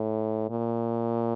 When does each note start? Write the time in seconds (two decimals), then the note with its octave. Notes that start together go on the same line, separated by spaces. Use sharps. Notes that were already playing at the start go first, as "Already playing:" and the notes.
Already playing: A2
0.49 A#2